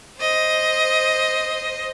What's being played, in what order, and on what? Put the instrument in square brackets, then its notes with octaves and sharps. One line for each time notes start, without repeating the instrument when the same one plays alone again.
[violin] C5 D#5